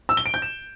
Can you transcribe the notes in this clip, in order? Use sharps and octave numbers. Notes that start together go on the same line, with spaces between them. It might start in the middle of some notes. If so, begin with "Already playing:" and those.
E6
G7
D7
G6
E7